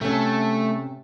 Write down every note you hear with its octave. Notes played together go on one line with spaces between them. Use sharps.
C3 A3 B3 C#4